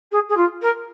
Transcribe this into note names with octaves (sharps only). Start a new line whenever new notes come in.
G#4
G#4
F4
A#4